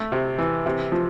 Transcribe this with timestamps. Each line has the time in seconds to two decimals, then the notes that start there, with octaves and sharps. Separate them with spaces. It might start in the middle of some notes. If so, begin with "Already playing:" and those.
Already playing: A3
0.12 C3
0.38 E3
0.66 C3
0.92 F3